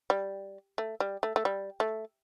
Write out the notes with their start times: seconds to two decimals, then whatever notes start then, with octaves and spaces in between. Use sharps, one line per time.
0.10 G3
0.78 A3
1.00 G3
1.23 A3
1.36 A3
1.45 G3
1.80 A3